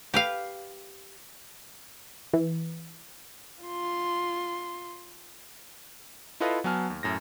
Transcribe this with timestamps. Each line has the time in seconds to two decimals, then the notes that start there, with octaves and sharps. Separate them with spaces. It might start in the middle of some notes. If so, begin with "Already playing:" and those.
0.14 G4 B4 F5
2.33 E3
3.64 F4 C6
6.40 E4 F4 A4 B4 D#5 F5
6.64 F#3 B3 G#5 A5 F6
6.90 D#2
7.03 F#2 A2 A#6